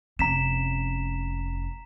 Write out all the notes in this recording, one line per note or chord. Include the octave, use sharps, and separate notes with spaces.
F1 C#4 A#5 B6 E7